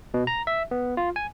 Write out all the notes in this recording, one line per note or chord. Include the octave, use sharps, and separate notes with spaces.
B2
A#5
E5
B3
F4
G#5